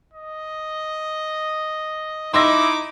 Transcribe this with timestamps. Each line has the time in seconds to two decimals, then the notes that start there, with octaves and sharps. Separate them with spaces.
0.14 D#5
2.34 D#4 E4 C6 D6 E6 A#6